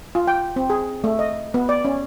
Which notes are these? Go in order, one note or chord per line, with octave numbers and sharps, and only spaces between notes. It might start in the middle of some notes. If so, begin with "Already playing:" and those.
F4
G5
C4
G#4
A3
D#5
B3
D5
C#4